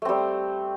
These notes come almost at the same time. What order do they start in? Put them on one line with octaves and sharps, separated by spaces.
A3 C4 G3